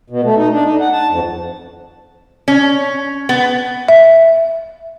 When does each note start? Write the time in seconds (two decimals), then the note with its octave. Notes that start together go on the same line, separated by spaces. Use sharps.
0.10 B2
0.24 A3
0.37 D#4
0.52 D4
0.65 D#4
0.81 F#5
0.93 A5
1.09 F2
2.48 C#4
3.29 B3
3.88 E5